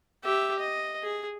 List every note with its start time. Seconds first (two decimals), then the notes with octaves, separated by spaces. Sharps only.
0.24 G4 E5
0.59 D#5
1.03 G#4